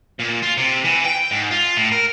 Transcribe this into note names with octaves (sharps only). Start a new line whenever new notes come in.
A#2
F4
C3
E3
G5
G#2
F4
A2
A#4